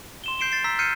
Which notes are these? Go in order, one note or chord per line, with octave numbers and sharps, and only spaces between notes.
C6 E7 G7
G6 C7 D7 E7 G7
A6 C7
A#5 E6 B6
F6 G6 C7 C#7 D#7